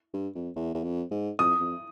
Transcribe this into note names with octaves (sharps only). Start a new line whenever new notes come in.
G2
F2
E2
E2
F2
G#2
F2 D#6
F2